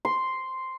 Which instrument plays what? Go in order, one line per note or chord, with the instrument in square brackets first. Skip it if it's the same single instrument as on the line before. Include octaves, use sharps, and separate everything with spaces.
[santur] C6